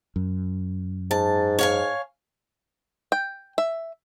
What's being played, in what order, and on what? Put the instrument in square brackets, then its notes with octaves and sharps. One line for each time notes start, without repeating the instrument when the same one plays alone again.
[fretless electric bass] F#2
[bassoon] G#2 [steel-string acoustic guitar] A5
[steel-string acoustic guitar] C#5 F5 G#5
[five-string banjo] G5
E5